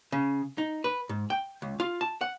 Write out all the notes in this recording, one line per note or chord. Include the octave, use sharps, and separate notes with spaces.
C#3
D#4
B4
G#2
G5
C#2
F4
A5
F#5